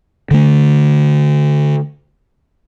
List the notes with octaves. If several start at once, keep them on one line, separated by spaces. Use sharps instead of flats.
D3 A3